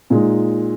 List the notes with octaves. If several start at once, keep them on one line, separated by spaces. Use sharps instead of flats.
A#2 G#3 D#4